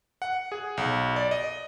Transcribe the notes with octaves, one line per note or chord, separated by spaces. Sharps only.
F#5
G#4
B1
D5
D#5